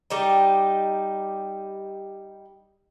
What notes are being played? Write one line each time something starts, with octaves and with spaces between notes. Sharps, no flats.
G3 D#4